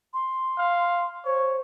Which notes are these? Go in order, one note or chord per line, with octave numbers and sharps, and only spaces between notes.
C6
F5
C5 C#5